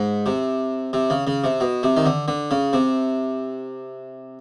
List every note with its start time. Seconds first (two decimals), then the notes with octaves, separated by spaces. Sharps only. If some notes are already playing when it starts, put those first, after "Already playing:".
Already playing: G#2
0.26 C3
0.93 C3
1.10 C#3
1.27 C#3
1.44 C3
1.60 B2
1.83 C3
1.97 D#3
2.06 D3
2.28 D3
2.51 C#3
2.73 C3